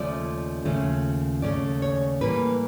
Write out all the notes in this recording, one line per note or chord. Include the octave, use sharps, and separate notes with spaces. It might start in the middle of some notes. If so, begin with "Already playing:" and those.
Already playing: D#2 C#3 F3 A3 C#4 D5
D#2 C#3 F3 A3 C#4
D#2 C#3 F3 A3 C#4 D5
C#5
A2 E3 G3 A#3 B4